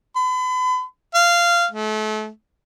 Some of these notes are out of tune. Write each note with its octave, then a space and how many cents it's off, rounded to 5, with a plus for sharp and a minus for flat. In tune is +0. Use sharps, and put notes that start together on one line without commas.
B5 +40
F5 -15
A3 -35